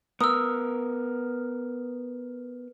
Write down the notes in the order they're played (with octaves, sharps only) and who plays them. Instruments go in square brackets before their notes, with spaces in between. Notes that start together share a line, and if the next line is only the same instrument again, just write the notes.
[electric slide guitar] B3 A#4 [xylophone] D#6 E6